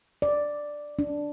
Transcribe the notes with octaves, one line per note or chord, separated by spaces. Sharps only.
D5
D4